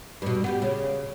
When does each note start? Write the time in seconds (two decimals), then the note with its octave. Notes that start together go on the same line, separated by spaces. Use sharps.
0.22 G2 B2
0.44 B3 F#4 G4
0.62 C#3